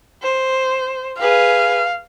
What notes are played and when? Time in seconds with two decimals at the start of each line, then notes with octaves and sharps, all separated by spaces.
0.22 C5
1.20 G#4 B4 F5